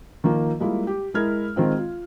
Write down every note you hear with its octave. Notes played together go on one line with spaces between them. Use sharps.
D#3 F3 A#3
G3 G#3 A#3 E4 F4
G4
G#3 E4 A#4 F6 G#6
D#3 G#3 C4 F4
F4